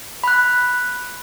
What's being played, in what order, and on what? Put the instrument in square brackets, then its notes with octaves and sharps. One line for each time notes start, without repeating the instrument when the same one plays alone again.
[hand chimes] B5 F#6